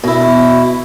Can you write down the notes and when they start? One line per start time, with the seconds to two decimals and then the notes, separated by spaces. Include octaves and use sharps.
0.04 B2 E4